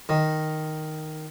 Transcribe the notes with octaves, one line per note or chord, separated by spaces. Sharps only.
D#3